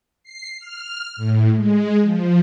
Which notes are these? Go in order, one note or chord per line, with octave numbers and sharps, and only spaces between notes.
C7
F6
A2
G#3
F3